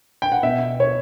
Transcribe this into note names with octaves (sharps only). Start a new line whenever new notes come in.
G5
F#5
B2 E5
C#5